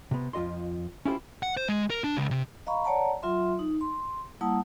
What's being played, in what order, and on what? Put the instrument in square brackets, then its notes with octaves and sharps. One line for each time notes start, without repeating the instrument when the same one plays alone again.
[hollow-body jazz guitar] C3 B3
F2 F4 D#5 C6
C#4 E4 F4 G4 A#4 C5
[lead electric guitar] F#5
C5
G#3
A#4
D4
C#2
C3
[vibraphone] D#5 F5 A#5 B5 C#6
C#5 D5 F#5 A5 A#5
F#3 F4 E5 C6
D#4
C6
G3 A#3 E4 F#5 A5 D#6